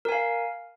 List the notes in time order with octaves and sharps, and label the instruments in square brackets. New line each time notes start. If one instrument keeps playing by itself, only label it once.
[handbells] A#4
G#5
F5